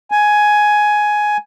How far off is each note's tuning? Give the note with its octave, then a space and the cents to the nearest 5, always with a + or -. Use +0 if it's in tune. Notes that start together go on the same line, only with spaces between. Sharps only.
G#5 +10